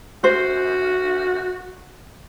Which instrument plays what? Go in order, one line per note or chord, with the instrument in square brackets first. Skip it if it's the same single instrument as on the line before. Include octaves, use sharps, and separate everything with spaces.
[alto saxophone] F#4 [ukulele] C5